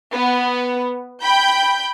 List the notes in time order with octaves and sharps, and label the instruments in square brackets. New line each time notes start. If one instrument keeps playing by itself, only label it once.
[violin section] B3
G5 B5 G6